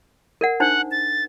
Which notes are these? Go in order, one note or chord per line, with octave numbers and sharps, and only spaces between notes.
A#4 D5 F#5
D4 D#4 C5 F#5
A6